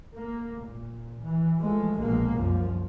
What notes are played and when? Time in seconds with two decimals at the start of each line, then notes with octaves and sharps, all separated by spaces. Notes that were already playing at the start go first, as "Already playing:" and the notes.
0.15 A#3
0.62 A#2
1.21 E3
1.60 F3 G#3 A3
1.96 A#1 B2 G#3 A#3
2.29 C2 F#2 F3